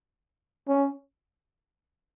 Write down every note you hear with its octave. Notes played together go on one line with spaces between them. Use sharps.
C#4